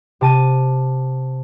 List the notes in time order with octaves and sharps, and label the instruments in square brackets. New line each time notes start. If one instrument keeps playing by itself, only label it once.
[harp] C3 A5 D#7